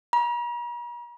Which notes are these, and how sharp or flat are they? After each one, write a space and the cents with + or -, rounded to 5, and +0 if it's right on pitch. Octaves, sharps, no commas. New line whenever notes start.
A#5 +45